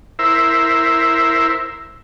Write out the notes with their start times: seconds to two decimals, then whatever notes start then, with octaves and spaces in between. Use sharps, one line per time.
0.19 E4 A#4 C5 E5